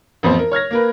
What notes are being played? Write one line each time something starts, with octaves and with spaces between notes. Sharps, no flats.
A1 F2 B3 C5
A#4
C#5 F6 G#6 A#6
A#3 A#4 B4